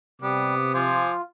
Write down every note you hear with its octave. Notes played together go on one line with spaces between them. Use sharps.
C3 G3 B3 D6
F3 F4 G#5 D6